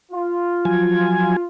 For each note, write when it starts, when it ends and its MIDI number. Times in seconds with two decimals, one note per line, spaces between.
0.12 1.46 65
0.65 1.36 53
0.65 1.36 54
0.65 1.36 80